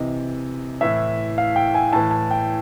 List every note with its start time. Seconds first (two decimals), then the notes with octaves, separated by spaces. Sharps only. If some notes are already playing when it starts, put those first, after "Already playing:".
Already playing: C3 E3 D#5
0.81 A2 E3 E5
1.38 F5
1.56 G5
1.74 G#5
1.93 A2 E3 A5
2.11 A5
2.31 G5